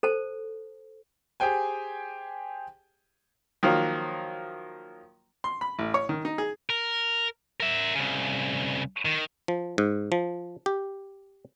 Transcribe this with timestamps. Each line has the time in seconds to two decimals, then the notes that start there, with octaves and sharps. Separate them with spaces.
0.03 A4 C5 A5
1.40 G4 G#4 C5 G5 G#5
3.63 D#3 F3 F#3 A#3
5.44 C6
5.61 B5
5.79 A1
5.94 C#5
6.09 D#3
6.25 D#4
6.38 G#4
6.70 A#4
7.60 A#4 E5
7.95 C2 C#3
9.05 D#3
9.48 F3
9.78 G#2
10.12 F3
10.66 G4